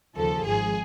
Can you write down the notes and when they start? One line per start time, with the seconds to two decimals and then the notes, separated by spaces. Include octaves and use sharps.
0.15 D#2 C#3 F3 A4
0.44 G#1 G#2 F3 G#4